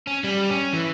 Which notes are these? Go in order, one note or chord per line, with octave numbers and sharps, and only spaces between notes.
C#4
G3
C#4
E3